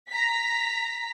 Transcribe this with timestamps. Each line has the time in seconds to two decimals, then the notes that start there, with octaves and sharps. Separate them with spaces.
0.11 A#5 B6